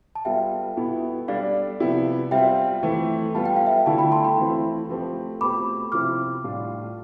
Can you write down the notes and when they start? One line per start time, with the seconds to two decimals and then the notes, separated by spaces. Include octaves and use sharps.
0.15 A5
0.25 G3 B3 F4 A4 E5 G5
0.77 B2 B3 E4 A4
1.28 G3 D4 A4 D5 F5
1.80 C3 F3 B3 E4 G4
2.31 G3 C4 F4 E5 G5
2.83 E3 A3 C4
3.35 G3 B3 F4 A4 A5
3.45 G5
3.56 F5
3.67 E5 G5
3.86 D3 A3 E4 A4 F5 A5
3.98 G5 B5
4.12 A5 C6
4.25 G5 B5
4.38 E3 A3 C4 E4
4.89 F3 A3 C4 G4
5.40 B2 A3 C4 G4 B5 D6
5.92 C3 F3 C4 E4 D6 F6
6.44 A2 G3 D4 F4